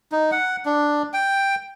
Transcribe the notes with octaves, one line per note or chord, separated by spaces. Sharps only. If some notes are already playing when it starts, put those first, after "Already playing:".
D#4
F#5
D4
G5